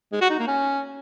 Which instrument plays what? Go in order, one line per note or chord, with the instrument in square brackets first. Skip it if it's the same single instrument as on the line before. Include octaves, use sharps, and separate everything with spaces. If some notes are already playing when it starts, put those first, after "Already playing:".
[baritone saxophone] G#3
F#4
D#4
A#3
C#4